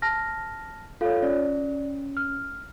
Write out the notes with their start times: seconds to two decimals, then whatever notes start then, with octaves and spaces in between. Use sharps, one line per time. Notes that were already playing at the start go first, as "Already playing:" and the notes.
0.02 A5 F6 A#6
1.01 F4 A4 C#5 F5
1.23 C#4 D5
2.17 F6